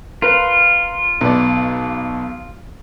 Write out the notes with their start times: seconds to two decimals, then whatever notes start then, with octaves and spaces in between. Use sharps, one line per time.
0.22 F4 A#4 B4
1.21 B1 B3 D5